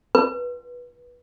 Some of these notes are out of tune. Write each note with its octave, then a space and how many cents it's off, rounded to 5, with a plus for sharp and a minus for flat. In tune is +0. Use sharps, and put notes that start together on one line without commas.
B4 -20